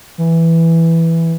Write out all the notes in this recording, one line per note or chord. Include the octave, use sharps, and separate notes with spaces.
E3